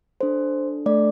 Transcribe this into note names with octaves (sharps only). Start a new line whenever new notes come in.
D4 A4 C5
A3 D4 A4 D5